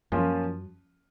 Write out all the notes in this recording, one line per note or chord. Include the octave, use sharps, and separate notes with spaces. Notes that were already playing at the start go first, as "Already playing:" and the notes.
F#2 F3 A#3 C#4 F4